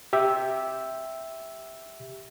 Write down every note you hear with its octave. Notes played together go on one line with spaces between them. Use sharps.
G4 E5 E6